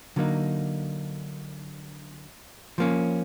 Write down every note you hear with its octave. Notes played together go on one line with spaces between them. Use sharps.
D3 F#3 A#3 D#4
F3 A#3 C#4